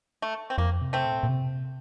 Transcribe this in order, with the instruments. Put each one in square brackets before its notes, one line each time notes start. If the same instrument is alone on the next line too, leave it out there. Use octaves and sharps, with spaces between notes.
[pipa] A3
C4
[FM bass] F2 [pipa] A#3
[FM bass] C3
[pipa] A3 C4
[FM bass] A#2
A#2
C3